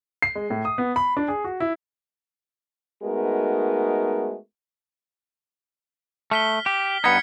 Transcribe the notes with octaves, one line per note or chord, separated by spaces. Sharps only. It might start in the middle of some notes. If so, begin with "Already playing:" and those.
C7
G#3
A2
D#6
B3
B5
D4
G#4
F#4
E4
G#3 A3 B3 D#4 F#4 A#4
A3 F6 B6 G7
G4
G2 B3 D#4 G#6 B6 C#7